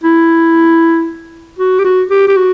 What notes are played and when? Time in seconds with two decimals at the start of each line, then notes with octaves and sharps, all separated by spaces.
0.03 E4
1.59 F#4
1.79 G4
1.84 F#4
2.11 G4
2.28 G4
2.36 F#4